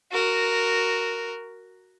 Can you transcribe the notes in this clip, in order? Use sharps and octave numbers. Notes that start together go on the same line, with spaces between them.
F#4 A#4